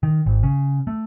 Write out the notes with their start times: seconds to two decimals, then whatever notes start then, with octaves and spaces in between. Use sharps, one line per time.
0.03 D#3
0.26 G#1
0.43 C#3
0.87 A3